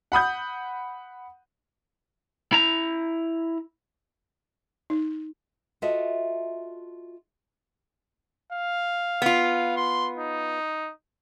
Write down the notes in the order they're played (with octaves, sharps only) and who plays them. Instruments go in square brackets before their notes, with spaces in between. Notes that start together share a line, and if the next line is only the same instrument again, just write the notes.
[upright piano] F#5 B5 D#6 G6
[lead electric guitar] E4 A#5
[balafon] D#4
[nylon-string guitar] F4 F#4 A4 D#5 E5
[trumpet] F5
[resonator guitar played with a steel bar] B3 F4
[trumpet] C6
D#4